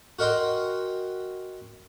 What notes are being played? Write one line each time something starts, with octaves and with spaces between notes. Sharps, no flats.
F#4 A#4 D#5 G5 C6